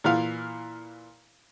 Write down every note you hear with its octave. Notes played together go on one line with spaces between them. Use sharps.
A#2 E3 F5